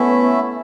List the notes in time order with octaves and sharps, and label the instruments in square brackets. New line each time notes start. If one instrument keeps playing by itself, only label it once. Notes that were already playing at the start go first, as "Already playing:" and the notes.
Already playing: [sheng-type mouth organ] A3 C#4 E4 A4 E5 [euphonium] B3